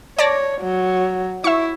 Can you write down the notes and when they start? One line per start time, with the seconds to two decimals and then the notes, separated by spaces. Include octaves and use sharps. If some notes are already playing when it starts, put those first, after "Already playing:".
0.18 C#5 D5 A5 A#6
0.61 F#3
1.44 E4 E5 C#6